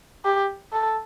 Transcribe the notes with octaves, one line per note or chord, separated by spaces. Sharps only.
G4
A4